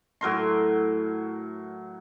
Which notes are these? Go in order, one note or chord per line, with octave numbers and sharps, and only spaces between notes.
A2 F#3 A#4 C6